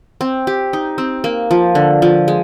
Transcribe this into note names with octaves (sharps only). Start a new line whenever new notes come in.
C4
G4
D#4
C4
A#3
F3
D3
F3
G#3